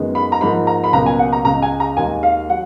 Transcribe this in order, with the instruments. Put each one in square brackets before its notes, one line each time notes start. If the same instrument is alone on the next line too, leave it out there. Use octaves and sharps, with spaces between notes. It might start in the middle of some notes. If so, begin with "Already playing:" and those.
Already playing: [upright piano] F#2 D#3 G#3 B3
B5
A#5
G#2 F3 A#3 B5
A#5
B5
C#2 B2 F#3 A#3 A#5
G#5
F#5
A#5
C#2 C#3 G#3 A#5
G#5
A#5
D#2 D#3 G#3 G#5
F5
F#3 F#5